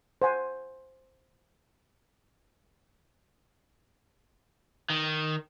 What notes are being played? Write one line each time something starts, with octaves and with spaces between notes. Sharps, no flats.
C5 F#5 G#5
D#3